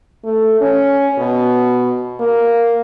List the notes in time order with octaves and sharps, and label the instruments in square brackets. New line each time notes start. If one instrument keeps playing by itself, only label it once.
[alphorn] A3
C#4
B2
A#3